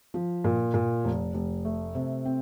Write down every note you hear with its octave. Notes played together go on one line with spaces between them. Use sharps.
F3
A#2
A#2
F1
F1
A3
C3
C4